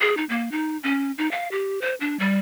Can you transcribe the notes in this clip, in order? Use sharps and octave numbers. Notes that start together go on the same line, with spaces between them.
G#4
D#4
A#3
D#4
C#4
D#4
F5
G4
C5
D4
G3